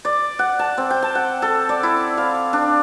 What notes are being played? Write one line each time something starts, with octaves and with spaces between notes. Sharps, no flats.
D5
F#5
A5
C4
G5
A5
F#5
A4
D5
E4
F5
D4